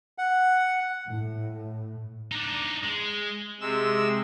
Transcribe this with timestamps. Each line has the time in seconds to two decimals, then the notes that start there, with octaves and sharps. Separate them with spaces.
0.18 F#5
1.06 A2
2.32 D4 D#4
2.84 G#3
3.60 C3 G#3 E6